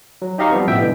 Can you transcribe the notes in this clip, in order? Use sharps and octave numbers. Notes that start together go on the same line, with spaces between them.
F#3
D#4 G4 D#5 F5 A#5 C#6
F3 G3 B3 C4
A1 B2 E3 B3 E5 G5
G2 B2 D3 E3